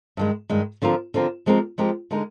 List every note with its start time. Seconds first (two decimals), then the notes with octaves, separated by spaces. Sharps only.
0.17 G2 D#3 G#3
0.50 G2 D#3 G#3
0.82 D3 F3 C4 F4 A#4
1.14 D3 F3 C4 F4 A#4
1.46 F3 G#3 C4 G4 A#4
1.78 F3 G#3 C4 G4 A#4
2.11 D3 G#3 D#4 A#4